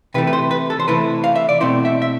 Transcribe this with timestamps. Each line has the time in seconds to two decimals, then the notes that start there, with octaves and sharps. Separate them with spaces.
0.14 C3 E3 A3 E4 B4
0.27 B4
0.33 C5
0.51 B4
0.70 A4
0.80 C5
0.88 C3 E3 A3 E4 B4
1.24 F5
1.36 E5
1.49 D5
1.61 B2 A3 C4 E4 C5
1.85 E5
2.02 E5